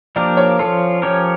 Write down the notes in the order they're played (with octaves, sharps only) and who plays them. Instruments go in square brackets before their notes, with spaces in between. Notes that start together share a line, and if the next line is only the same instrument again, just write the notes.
[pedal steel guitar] F3 A#3 D4 G4 A#4 [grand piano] D5
[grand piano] C#5
[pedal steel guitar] F3 C#4 F4 [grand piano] A4
[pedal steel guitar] F3 C#4 G4 A#4 C#5